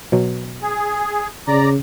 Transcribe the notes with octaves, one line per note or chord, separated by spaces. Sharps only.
B2 F#3
G#4
C#3 D5 A#5